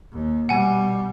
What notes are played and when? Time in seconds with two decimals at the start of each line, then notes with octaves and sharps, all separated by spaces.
0.12 D#2
0.49 B2 G3 F#5 G#5